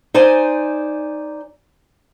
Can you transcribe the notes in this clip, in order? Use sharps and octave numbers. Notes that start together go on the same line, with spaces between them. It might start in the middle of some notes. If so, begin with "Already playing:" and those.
D#4 C5 D5 G#5